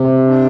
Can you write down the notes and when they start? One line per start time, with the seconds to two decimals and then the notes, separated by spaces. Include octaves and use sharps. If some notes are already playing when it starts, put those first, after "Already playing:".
Already playing: C3
0.27 D4